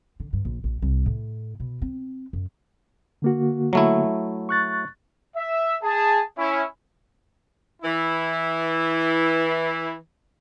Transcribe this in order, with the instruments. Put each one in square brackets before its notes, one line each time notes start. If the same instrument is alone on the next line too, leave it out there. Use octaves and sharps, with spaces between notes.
[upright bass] D3
G2
A#1
A#1
C2
A2
B2
C4
F#2
[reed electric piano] D3 A#3 F#4
[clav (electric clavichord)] F#3 A3 E4
[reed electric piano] C#6 F#6 A6
[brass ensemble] E5
G#4 A5
C#4 E4
[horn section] E3 E4